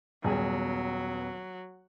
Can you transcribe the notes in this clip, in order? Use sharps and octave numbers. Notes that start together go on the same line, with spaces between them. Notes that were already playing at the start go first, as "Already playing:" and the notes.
D#1 G2 F#3 B3 G#4